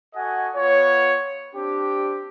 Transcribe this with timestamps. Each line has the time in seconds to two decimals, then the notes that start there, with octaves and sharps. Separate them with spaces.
0.14 F#4 A4 D#5 F#5 G#5
0.55 B3 F4 C#5
1.55 C4 D4 G4